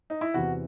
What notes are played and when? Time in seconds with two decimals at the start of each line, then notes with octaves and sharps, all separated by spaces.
0.10 D#4
0.21 E4
0.34 E2 C3 E3 F#4